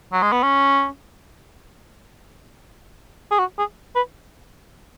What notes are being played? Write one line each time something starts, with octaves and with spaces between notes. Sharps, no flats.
F#3
G#3
B3
C#4
G#4
F#4
G#4
B4